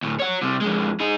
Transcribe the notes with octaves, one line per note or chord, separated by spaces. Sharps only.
D2 A2
C#5 F#5
C3 G3
F2 G#3
D#4 G#4